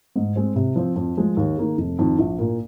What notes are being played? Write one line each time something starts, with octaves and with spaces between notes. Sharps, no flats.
G#2
G#3 C4
C3
F3 C4
F2
F3 G#3
D#2
D#3 A#3 G#4
F1
F2 D#3
A#1
A#2 A#3